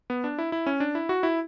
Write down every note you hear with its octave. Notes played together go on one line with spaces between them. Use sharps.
B3
D4
E4
E4
C#4
D4
E4
F#4
E4